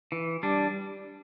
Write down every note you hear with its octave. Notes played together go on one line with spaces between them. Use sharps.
E3
G3 D4